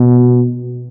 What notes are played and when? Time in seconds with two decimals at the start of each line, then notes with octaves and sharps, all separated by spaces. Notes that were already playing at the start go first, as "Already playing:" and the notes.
Already playing: B2